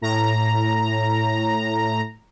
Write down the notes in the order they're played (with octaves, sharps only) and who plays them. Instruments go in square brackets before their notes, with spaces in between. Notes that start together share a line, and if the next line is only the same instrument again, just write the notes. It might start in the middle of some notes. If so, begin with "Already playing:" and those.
[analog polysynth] A2 A#5